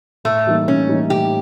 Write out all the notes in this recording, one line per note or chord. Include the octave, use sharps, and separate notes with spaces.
A2 A3
E3 G3 A#3 D#4
A2 C#4
E3 G3 A#3 D#4
A2 G4